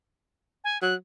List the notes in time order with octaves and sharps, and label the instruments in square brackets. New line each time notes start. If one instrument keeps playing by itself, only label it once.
[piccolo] G#5
[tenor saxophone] F#3 [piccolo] F#6